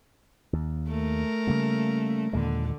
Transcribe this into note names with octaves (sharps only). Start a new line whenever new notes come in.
D#2
A3 A#4
C#3 G3 A#3
D#2 A#2 D3 G#3